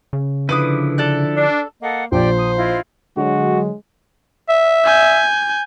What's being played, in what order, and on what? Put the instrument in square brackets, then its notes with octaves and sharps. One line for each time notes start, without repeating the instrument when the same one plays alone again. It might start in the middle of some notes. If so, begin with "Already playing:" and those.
[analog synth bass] C#3
[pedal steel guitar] D3 F3 E4 [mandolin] B4 D6 D#6
[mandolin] A4 D5 F#6
[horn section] D4
[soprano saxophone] A#3 [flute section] A4 D#5 F#5
[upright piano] A#1 [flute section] G4 D5 G5 [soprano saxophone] C5
[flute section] D#6
E4 F4 D#5
[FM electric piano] D3 F#3 [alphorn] G#3 [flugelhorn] F#4
[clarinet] E5
[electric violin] G#5 G6